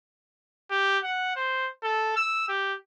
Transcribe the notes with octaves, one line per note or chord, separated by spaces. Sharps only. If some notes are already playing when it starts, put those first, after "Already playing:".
G4
F#5
C5
A4
E6
G4